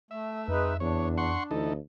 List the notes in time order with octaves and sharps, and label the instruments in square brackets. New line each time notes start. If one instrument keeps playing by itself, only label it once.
[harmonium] A3 [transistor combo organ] E5
[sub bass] F2 [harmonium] G#3 D#4 B4
[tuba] E2 [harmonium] D4 [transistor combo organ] C#5
[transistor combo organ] F#5 C6 C#6
[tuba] D2 [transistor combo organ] E3 D#4 A4